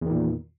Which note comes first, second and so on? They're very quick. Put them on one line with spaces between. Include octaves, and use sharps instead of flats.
E2 D#3 A#2